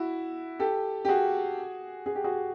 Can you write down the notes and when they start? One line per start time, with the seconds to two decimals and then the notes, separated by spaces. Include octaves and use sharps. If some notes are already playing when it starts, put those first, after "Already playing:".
Already playing: E4 F#4
0.60 G4 A4
1.05 G4
1.08 F#4 G#4
2.06 G#4
2.15 G4
2.24 F#4 G#4